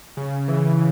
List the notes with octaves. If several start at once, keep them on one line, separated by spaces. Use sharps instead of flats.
C#3
E3